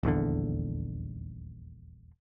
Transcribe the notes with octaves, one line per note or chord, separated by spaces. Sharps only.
D#1 A#1 E2 D3